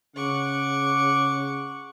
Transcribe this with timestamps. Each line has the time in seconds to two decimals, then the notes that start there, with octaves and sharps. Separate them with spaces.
0.16 C#3 F#5 C#6 D6